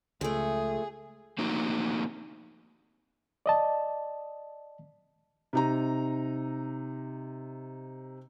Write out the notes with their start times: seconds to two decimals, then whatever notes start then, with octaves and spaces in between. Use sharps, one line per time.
0.21 C#2 F3 A3 G#4
1.38 A3 A#3 C4 D#4 F#4
3.46 D5 D#5 A5
5.53 C3 D#4 A#5